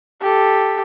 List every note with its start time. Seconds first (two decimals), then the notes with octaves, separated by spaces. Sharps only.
0.22 G4 A4